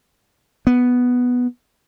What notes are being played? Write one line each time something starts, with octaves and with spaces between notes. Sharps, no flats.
B3